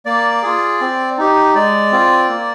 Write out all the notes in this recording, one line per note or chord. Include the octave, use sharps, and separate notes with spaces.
A#3 D5
F4 G#4
C4
D#4 G4
G#3 D5
C4 F4
A#3